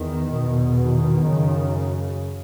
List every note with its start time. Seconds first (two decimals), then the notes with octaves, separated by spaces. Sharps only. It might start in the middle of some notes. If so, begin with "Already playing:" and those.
Already playing: E2 D#3
0.35 E2 B2
0.81 D#3
1.27 F#2 C#3